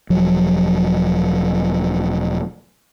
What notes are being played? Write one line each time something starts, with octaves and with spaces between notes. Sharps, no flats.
E1 F3 F#3